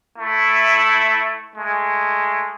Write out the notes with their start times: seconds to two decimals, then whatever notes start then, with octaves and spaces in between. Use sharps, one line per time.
0.17 A3 E4
1.56 G#3 A3